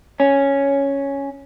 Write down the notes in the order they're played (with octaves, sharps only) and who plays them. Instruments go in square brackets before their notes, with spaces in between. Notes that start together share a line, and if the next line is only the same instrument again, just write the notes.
[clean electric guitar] C#4